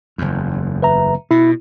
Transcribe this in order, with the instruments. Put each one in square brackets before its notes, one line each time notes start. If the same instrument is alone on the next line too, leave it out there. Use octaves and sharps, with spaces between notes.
[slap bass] F#1 E2
[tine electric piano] B4 E5 A#5
[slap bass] B2 [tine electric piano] E4